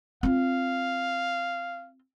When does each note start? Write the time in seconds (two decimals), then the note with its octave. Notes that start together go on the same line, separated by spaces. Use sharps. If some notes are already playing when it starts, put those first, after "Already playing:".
0.23 C4 F4 F5